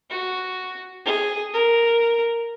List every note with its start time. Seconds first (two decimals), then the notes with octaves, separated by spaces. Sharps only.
0.10 F#4
1.05 G#4
1.53 A#4